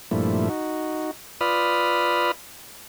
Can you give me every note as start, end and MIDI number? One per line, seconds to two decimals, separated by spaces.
0.11 0.49 43
0.11 0.49 46
0.11 0.49 53
0.11 0.49 57
0.11 0.49 64
0.49 1.11 63
0.49 1.11 66
1.41 2.31 65
1.41 2.31 71
1.41 2.31 74
1.41 2.31 83
1.41 2.31 87
1.41 2.31 89